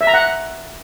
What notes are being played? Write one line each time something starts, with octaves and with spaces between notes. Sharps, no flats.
E5
A#5
F#5